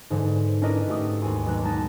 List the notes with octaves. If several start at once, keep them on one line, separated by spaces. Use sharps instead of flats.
G#2 D3 E3
C#4 D4 E4 A#4 B4 D#5
G#2 A3 F#4 G4 A4 D#6
D#2 F#4 G#5 C6
B1 F#6
G#3 B3 D#4 A5 A6 A#6